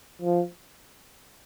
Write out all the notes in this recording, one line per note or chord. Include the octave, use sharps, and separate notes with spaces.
F3